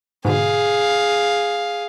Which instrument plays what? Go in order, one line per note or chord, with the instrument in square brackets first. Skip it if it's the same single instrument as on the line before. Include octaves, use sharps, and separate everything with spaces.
[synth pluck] G#2 B2 D3 [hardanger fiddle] G#4 F5